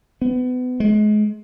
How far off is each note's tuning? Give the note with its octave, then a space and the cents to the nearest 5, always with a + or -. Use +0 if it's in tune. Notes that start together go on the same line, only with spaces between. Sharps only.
B3 +30
G#3 +30